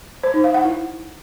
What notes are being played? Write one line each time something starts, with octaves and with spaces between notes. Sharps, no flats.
C5
D#4
F5
F#5
E4